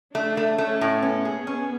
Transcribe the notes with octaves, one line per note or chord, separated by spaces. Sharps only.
A3 D4
A3
A3 C#4
A2
B3 C#4
G#4
C#4